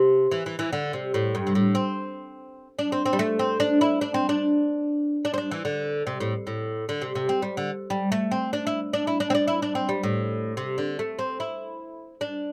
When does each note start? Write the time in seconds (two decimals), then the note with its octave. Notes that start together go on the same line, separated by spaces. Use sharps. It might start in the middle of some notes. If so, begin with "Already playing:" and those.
Already playing: C3
0.32 E3
0.46 E3
0.59 E3
0.73 D3
0.93 C3
1.14 A2
1.35 G2
1.47 C3
1.55 A2
1.75 C4
2.79 D4
2.92 C4
3.06 C4
3.13 G3
3.19 A3
3.39 C4
3.60 D4
3.81 E4
4.01 D4
4.14 C4
4.29 D4
5.25 D4
5.34 C4
5.38 D4
5.51 E3
5.65 D3
6.07 C3
6.20 A2
6.47 A2
6.89 D3
7.02 C3
7.15 C3
7.29 C4
7.42 G3
7.57 D3
7.90 G3
8.12 A3
8.31 C4
8.53 D4
8.67 E4
8.93 D4
9.07 E4
9.20 D4
9.30 C4
9.35 D4
9.48 E4
9.62 D4
9.75 C4
9.89 G3
10.03 A2
10.57 C3
10.78 D3
10.99 A3
11.19 C4
11.40 E4
12.21 D4